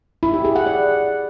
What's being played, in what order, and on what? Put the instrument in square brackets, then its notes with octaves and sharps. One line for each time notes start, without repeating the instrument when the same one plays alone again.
[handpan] E4
G4
G#4
F#5
D5